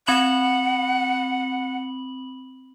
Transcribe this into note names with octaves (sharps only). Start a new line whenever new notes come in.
C4 F#5 B5 F#7